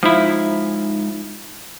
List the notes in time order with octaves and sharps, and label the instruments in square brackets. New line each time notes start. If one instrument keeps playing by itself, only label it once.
[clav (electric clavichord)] F3 E4 [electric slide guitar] G#3 D#4 E5